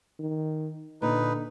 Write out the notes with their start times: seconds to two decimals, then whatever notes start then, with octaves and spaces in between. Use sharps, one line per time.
0.20 D#3
1.02 A#2 D3 D#4 B4